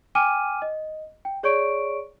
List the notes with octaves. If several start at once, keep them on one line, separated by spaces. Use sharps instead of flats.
G5 G#5 D6 F6 D#7
D#5
G5
G#4 C#5 D5 C#6 D7